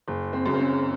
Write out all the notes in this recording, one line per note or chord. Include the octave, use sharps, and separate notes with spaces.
F#1
C4
F#2 C#3
C4
C#4